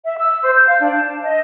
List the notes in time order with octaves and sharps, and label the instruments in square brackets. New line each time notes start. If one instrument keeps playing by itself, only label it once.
[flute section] E5
E6
C5
G6
F5
D4
A5
D#5